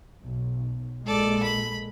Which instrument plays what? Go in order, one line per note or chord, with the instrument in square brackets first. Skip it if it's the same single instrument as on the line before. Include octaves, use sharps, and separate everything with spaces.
[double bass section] B1
[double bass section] A#1 A#2 G#3 [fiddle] A4 D5
[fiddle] B5